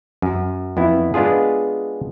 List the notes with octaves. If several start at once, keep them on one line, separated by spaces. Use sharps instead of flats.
F#2
F2 B3 E4
G#3 B3 D4 F4 G#4